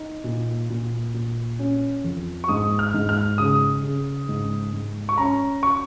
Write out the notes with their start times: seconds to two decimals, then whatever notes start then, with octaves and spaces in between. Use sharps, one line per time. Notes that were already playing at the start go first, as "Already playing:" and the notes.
Already playing: D#4
0.24 A#2
0.70 A#2
1.14 A#2
1.59 C#4
2.04 F2
2.44 C#6
2.49 G#2 D#6
2.79 F6
2.94 G#2
3.09 F6
3.38 C#3 D#6
3.83 C#3
4.29 G#2
4.73 G#2
5.09 C#6
5.18 C#4 A#5
5.63 C#6